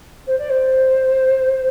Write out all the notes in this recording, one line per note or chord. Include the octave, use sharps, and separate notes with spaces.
C5
D5
C5